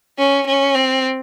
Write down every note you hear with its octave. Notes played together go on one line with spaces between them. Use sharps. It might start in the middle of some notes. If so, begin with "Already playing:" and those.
C#4
C#4
C4